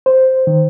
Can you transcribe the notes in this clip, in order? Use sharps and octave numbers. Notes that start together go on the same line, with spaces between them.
C5
D#3